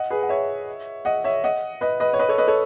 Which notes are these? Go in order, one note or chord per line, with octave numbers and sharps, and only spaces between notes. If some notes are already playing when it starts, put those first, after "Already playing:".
Already playing: D#5 F#5
G#4 B4
F#5
C#5 E5
D#5 F#5
C#5 E5
D#5 F#5
B4 D#5
B4 D#5
C#5
B4 D#5
A4 C#5
B4 D#5
A4 C#5